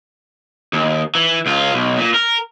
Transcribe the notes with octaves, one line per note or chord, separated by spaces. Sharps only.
D#2
E3
C#2 F4
B1
A#2
A#4